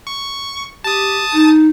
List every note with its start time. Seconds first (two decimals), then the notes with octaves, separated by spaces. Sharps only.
0.07 C#6
0.84 G4 A5 D#6
1.33 D#4